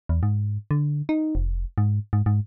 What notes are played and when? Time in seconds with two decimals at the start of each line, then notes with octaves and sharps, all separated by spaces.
0.09 E2
0.23 G#2
0.71 D3
1.09 D#4
1.35 F1
1.78 G#2
2.13 G#2
2.26 G#2